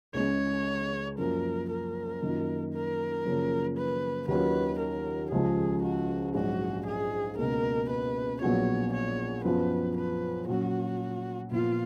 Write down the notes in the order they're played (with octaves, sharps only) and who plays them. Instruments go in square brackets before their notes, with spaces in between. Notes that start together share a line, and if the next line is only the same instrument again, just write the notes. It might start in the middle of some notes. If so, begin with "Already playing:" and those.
[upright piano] C#2 C#3 G#3 [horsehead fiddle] C#5
[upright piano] F#2 F3 A#3 [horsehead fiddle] A#4
[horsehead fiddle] A#4
[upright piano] F#2 D#3 A#3 F4
[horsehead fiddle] A#4
[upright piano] F#2 C#3 F3 A#3 C#4
[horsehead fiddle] B4
[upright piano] D#2 D#3 F#3 C#4 F4 [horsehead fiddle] B4
[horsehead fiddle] A#4
[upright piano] C#2 C#3 F3 G#3 [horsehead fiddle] G#4
[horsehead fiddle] F#4
[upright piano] A#1 G#2 F#3 C#4 [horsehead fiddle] F#4
[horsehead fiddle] G#4
[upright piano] C#2 B2 A#3 [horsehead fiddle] A#4
[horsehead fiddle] B4
[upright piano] A#1 A#2 F#3 B3 F4 [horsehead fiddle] C#5
[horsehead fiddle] C#5
[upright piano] F#2 F3 B3 F4 [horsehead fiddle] B4
[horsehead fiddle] B4
[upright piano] A#2 F#3 C#4 [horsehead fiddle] F#4
[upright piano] A#2 F3 B3 [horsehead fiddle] F4